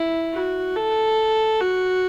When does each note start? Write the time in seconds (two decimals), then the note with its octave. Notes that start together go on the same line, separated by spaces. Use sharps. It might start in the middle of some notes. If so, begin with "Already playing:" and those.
Already playing: E4
0.33 F#4
0.76 A4
1.61 F#4